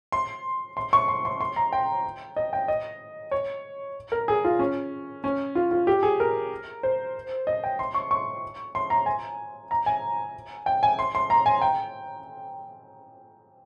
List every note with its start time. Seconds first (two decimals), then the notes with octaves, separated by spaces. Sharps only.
0.12 C6
0.77 C6
0.93 C#6
1.08 C6
1.25 C6
1.41 C6
1.56 A#5
1.72 G5
2.36 D#5
2.53 G5
2.68 D#5
3.31 C#5
4.12 A#4
4.28 G#4
4.44 F4
4.59 C#4
5.24 C#4
5.55 F4
5.71 F4
5.87 G4
6.03 G#4
6.20 A#4
6.83 C5
7.47 D#5
7.64 G5
7.79 C6
7.95 C#6
8.11 C#6
8.75 C6
8.90 A#5
9.06 G#5
9.71 A#5
9.86 G#5
10.66 G5
10.83 G#5
10.99 C6
11.15 C6
11.30 A#5
11.46 G#5
11.62 G5